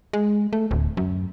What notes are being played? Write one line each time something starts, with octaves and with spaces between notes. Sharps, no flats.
G#3
A3
D1
F#2